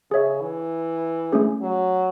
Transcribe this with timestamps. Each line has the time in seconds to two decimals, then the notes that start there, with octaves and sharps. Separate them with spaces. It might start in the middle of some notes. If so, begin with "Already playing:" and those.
0.11 C#3 G#4 C#5 E5
0.41 E3
1.32 A3 C#4 G#4
1.61 F#3